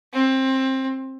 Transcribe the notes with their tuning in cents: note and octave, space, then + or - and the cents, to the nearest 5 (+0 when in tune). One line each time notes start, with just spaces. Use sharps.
C4 +20